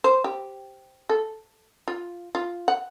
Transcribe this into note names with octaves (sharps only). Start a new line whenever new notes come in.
C5
G4
A4
F4
F4
F#5